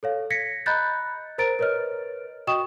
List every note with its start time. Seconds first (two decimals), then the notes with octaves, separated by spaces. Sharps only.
0.03 A4 C#5 F5
0.30 G#6 A#6 B6 C#7
0.66 D#5 A#5 B5 F#6 G6 A6
1.38 A#4 C5 A#5 A6 D7
1.59 A#4 B4 C#5 D#5 F6
2.47 F#4 D#5 G5 C#6 D#6 E7